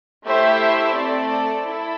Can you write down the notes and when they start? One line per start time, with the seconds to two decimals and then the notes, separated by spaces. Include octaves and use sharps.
0.24 A3 E4 G4 C5 E5
0.95 A3 C4 A4 D5
1.66 E4 A4